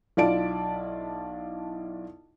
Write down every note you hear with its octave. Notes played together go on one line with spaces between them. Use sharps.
B1 E4 F4 D5 A5 D7